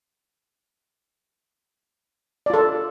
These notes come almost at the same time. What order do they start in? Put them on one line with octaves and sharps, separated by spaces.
D5 F4 A4